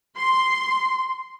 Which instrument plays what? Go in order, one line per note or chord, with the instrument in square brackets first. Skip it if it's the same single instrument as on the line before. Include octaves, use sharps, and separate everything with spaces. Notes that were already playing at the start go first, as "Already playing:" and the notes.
[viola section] C6